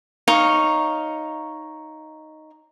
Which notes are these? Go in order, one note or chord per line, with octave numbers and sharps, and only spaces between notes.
D#4 C#5 F5